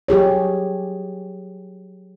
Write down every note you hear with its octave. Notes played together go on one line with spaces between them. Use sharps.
F#3 G4 G#4 C#5